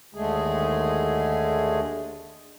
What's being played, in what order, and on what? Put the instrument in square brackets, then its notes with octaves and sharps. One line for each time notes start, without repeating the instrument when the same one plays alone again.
[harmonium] D#2 D3 G#3 A3 G#4